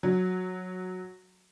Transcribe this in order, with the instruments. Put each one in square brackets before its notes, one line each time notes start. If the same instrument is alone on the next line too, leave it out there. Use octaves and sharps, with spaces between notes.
[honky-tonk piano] F#3